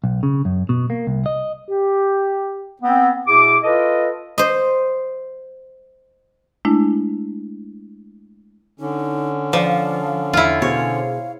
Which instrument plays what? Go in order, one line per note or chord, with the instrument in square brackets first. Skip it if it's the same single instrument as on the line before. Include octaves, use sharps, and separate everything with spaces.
[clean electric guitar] B1
C#3
F#2
B2
A#3
C2
D#5
[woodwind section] G4
B3 C4
B2 E4 G#4 D6
F4 A4 B4 D#5
[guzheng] C5 D#5
[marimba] G#3 A3 D4 E4
[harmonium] D3 C#4 [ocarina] D#4
[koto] F3 [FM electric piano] D5 [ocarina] F5
[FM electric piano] E2 [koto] E4 F4
[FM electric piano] B2 G#4 C5 [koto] C#5 [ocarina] F5